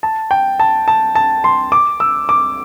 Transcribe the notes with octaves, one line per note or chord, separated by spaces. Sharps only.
A5
G5
A5
A5
A5
C6
D6
E6
D6